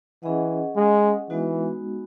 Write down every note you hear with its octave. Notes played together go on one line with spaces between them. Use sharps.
E3 C#4 G#4 D#5 F#5
G#3
E3 G#3 B3 D#4 F#4